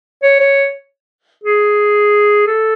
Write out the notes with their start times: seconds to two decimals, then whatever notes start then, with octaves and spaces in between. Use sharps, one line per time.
0.23 C#5
0.40 C#5
1.44 G#4
2.47 A4